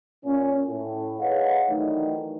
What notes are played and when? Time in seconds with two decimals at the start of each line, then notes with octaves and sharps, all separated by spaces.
0.25 A#2 C#4
0.67 A2
1.20 G#4 B4 C#5 D#5 F5 F#5
1.69 D#3 E3 F#3 A3 D4 D#4